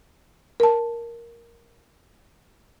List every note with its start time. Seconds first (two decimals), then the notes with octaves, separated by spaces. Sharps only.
0.60 A#4 A5